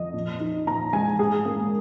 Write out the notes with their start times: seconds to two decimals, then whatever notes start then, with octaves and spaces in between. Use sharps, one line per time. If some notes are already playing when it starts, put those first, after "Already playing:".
Already playing: F2 D#5
0.14 A#2
0.40 D#4
0.66 A#2 A#5
0.93 G#3 G#5
1.19 G#2 G#4
1.45 A#3